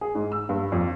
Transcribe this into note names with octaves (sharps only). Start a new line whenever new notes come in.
G#4
G#2
E6
G2
F2